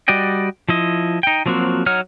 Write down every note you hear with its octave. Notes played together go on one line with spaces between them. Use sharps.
G3 F#4 D5 D#5 G5
F3 E4 D#5
D#4 G5
F3 F#3 A#3 C4 F#4
F#3 D#4 C#5 F#5 F6